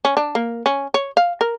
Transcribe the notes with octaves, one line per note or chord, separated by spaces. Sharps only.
C#4
D4
A#3
C#4
C#5
F5
A#4